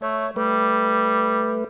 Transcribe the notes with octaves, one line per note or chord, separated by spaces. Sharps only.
A3 C#5
G3 A3 B4